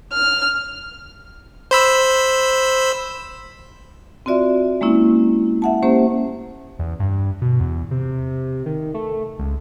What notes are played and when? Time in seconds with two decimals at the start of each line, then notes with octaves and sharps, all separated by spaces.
0.14 F6
1.71 C5 B5 E6
4.26 C4 F4 F#4 D5 E5
4.81 G#3 A#3 C#4 E4
5.62 E5 F#5 A5
5.83 A#3 C#4 G4 C5
6.79 E2
7.00 G2
7.42 B2
7.60 E2
7.91 C3
8.66 D#3
8.94 A3
9.39 C#2